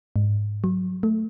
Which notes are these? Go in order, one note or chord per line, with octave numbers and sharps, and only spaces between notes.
G#2
F#3
A3